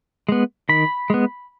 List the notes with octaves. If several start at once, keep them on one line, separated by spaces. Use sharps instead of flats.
G#3 B3
D#3 B5
G#3 B3